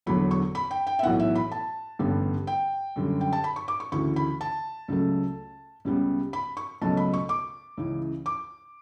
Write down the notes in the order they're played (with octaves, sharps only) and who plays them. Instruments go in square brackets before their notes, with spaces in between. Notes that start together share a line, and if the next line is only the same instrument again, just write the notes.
[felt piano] E1 E2 D3 F#3 B5
C#6
B5
G5
G5
E5
B1 A2 E3 B3 F#5
E5
B5
A5
A1 G2 D3 G3 B3
G5
F#2 D3 G3
G5
A5
B5
C#6
D6
C#6
D2 C#3 E3 C#6
B5
A5
C#2 C#3 F#3 A3
C#2 C#3 G3 B3
B5
C#6
C#2 B2 F#3 A3 A5
B5
C#6
D6
C#2 C#3 E3
D6